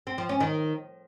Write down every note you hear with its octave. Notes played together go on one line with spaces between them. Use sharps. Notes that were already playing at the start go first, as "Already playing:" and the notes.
C4
F3
C#4
D#3